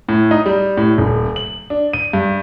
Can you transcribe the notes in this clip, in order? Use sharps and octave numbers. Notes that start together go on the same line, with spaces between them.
A2
D#4
G3
A2
D#1
F#7
D4
D#7
G2